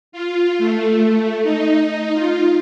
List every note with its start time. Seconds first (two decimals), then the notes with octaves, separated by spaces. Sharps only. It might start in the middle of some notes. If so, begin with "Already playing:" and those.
0.12 F4
0.58 A3
1.43 D#4
2.13 F4